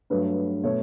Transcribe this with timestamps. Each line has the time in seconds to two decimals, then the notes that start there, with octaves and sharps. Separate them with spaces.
0.10 G2 F#3 A3 B4
0.63 B2 A3 C#5